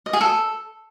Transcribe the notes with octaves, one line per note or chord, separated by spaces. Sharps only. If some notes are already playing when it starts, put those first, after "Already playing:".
D#5
G#4
A4